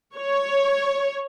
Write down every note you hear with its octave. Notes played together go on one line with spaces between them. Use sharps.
C#5